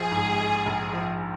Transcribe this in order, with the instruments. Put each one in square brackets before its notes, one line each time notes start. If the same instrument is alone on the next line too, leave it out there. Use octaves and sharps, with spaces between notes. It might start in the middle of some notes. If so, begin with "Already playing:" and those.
Already playing: [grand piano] A#1 F3 [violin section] G#4
[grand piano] G#2
G#3
A#1
F3